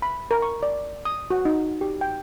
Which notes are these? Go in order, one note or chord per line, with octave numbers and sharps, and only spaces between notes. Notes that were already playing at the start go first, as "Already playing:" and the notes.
B5
A#4
C#6
D5
D#6
F#4
D#4
G4
G5